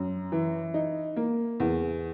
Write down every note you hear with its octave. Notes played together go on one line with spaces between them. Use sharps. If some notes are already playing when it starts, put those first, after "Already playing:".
Already playing: F#2
E3
D#4
A#3
E2